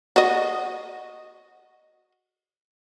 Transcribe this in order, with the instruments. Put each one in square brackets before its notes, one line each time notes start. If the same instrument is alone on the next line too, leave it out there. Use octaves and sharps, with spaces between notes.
[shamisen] F#4 D#5